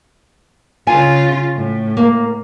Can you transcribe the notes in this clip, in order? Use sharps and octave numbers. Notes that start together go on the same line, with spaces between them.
C#3 F4 G#5
A2
A#3